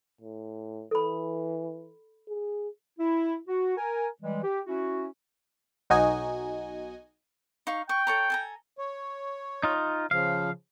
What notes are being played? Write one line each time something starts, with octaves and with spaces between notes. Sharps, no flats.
A2
E3 A4 B5
G#4
E4
F#4
A#4 G#5
E3 G3 G#3
G4
C#4 E4 F#4
B1 D#4 F#4 D#5 G#5
D#4 F5 C#6
G5 C#6
A4 C#5 A#5
A4 G#5 A#5
C#5
D#4 F4
C#3 F3 F5